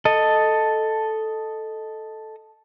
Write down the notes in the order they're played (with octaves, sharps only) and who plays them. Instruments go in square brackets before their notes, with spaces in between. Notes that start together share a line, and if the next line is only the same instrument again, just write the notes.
[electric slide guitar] A4 D#5